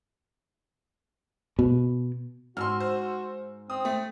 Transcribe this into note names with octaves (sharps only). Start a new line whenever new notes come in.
B2
G#2 F#4 C6 E6 F6
C5
C4 D#6
A3